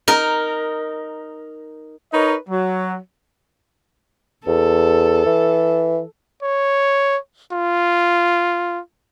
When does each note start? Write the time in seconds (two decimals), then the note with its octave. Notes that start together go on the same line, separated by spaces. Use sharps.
0.08 D#4 A#4
2.13 D#4 A#4 B4 C#5 D#5
2.49 F#3
4.47 E2 A4
5.26 E3
6.43 C#5
7.53 F4